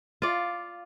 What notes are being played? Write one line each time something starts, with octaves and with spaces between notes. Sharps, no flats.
F4 D5